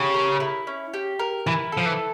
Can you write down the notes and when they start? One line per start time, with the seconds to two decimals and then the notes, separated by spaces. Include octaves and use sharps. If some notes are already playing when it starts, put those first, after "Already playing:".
Already playing: C#3 G4
0.14 A#4
0.40 E4
0.67 C#4
0.94 G4
1.19 A#4
1.47 E3 E4
1.72 F3 A4
1.86 E3